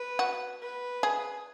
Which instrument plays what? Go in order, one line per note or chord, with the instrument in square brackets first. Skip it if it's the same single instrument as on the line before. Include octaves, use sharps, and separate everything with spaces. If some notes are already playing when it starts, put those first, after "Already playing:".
Already playing: [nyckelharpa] B4
[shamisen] F#4
[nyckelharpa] B4
[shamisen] G#4